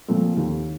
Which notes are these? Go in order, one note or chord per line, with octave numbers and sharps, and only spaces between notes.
A#2 F3 A3 C4
D#2